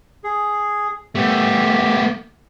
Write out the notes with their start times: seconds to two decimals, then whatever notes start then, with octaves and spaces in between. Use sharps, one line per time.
0.24 G#4
1.15 A3 B3 G4